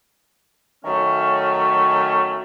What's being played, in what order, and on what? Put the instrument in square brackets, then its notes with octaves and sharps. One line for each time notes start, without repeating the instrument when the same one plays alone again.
[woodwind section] D#3 F#3 A3 C#4